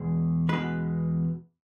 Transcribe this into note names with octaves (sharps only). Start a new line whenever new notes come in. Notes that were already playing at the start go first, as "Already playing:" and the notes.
Already playing: E2 B2 G#3
E2 B2 G#3 B4